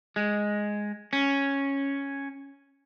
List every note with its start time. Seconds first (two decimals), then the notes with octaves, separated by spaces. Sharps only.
0.16 G#3
1.13 C#4